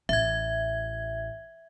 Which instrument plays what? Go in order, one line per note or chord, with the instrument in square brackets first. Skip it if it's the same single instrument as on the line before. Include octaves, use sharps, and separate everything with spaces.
[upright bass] A1 [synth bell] E5 G#6